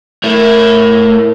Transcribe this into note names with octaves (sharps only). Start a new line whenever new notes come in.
A3 E4 A#4